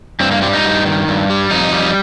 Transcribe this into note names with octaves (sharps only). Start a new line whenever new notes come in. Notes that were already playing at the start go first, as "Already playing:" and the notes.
G2 C4
A#3
G3 C4
D#4
G2
D#3
G2
G3
F2 D#4
G3